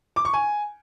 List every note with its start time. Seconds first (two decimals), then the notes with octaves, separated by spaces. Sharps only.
0.16 D6
0.25 C#6
0.34 G#5